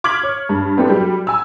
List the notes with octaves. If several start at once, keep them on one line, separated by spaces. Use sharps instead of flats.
D6 F6 G#6 B6 F#7
C#5
G2
B3 C4 D4 E4 G4 A4
F#3 G3
G#5 E6